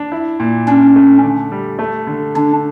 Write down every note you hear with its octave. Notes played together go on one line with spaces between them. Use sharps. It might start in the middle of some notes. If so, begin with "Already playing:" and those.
Already playing: D4
E4
A#2
C#4 D4
A3
D3
G3
A3
D3
D3 D4